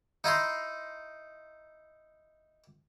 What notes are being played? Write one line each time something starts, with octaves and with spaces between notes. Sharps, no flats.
D#4 E4 A#5 C6